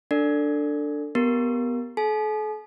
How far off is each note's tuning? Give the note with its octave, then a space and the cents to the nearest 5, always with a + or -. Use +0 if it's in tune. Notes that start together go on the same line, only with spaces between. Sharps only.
D4 +0 A4 +25 D5 +0
B3 +0 G4 +0 A#4 +10
A4 -45 G#5 +45